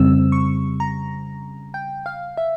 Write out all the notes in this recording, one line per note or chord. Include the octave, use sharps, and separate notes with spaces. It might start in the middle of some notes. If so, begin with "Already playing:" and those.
Already playing: F2 C#3 G3 C4 E6
C#6
A#5
G5
F5
E5